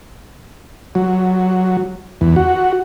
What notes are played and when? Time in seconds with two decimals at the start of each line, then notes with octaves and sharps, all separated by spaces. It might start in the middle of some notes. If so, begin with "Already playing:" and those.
0.95 F#3
2.21 E2
2.36 F#4